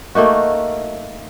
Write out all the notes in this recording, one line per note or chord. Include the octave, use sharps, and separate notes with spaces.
A3 A#3 D#4 F#4